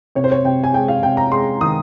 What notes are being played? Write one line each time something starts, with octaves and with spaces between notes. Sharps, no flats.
C3 C#5
C5
C#5
C3 G5
G#5
G#3 G5
F5
C3 G5
A#5
G#3 C6
D#3 D#6